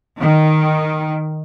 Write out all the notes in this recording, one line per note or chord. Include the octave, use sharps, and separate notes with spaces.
D#3